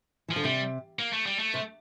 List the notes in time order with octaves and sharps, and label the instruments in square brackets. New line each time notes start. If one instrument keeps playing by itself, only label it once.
[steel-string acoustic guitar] E3
[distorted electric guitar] F3
[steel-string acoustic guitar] D3
[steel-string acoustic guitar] C3 [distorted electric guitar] G3
[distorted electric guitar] A#3
A3
G3
A3
[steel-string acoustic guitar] C3